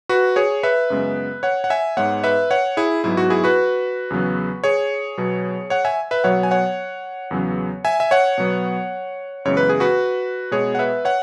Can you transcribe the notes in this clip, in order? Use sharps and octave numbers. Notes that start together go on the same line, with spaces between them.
F#4 B4
G#4 C#5
B4 E5
F#2 C#3 G#3 B3
C#5 F#5
F#5
E5 G#5
G#2 G#3 B3 C#5 F#5
B4 E5
C#5 F#5
E4 G#4
G#2 F#3 B3 E4
F#4
E4 G#4
F#4 B4
E2 C#3 F#3 B3
G#4 C#5
B2 F#3 B3
C#5 F#5
E5 G#5
B4 E5
B2 F#3 B3 C#5 F#5
G#5
C#5 F#5
E2 C#3 F#3 B3
E5 G#5
E5
C#5 F#5
B2 F#3 B3
F#2 C#3 E3 G#3 B3 C#5
B4
G#4
F#4 B4
B2 G#3 B3 G#4 C#5
F#5
B4 E5
C#5 F#5